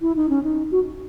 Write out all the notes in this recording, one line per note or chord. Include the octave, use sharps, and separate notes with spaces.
E4
D#4
C#4
D#4
F#4